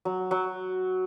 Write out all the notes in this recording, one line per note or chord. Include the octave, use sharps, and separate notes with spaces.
F#3
F#3